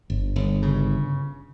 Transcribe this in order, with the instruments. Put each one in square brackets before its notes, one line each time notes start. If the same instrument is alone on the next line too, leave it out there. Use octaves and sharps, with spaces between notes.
[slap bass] G1
G1
C#3